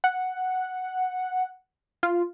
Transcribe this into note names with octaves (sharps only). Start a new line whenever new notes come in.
F#5
F4